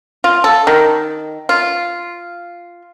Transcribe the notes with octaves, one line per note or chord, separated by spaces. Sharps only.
F4
A4
D#3
F4